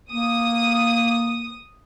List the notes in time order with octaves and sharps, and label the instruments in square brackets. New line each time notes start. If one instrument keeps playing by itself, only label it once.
[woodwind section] A#3 [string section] D#6